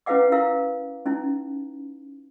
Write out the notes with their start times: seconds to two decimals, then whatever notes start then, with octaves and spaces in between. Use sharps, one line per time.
0.06 C#4 E4 B4 F5 F#5 D6
0.32 E4 A#4 F5
1.06 C#4 D#4 E4